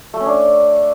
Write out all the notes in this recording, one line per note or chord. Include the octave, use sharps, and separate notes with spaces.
A3
C#4
D4